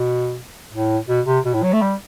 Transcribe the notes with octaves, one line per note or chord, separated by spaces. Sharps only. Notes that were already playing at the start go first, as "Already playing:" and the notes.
Already playing: B2
A2
B2
C3
B2
A2
F#3
A3
G3